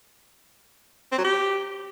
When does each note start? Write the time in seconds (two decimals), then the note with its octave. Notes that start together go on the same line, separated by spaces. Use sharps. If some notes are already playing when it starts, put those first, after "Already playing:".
1.12 C4
1.18 F#3
1.25 G4